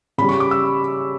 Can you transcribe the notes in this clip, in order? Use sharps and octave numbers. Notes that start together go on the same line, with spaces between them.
C#3 G3 B5
C#6
D6
E6